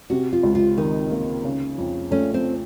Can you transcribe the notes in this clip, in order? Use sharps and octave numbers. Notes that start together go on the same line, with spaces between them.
C3 F#4
F4
C#2
F4
D#3 D#4
A#3
C#3
F2
A3 C#4
C4